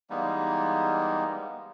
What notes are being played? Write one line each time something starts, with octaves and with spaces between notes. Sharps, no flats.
E3 G3 G#3 A#3 B3 D#4